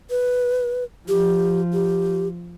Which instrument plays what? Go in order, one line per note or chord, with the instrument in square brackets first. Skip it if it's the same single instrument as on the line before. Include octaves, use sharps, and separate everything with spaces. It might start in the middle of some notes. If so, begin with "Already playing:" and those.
[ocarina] B4
[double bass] F3 [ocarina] G4
[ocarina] G4